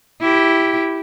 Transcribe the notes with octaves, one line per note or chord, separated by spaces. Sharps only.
E4 G4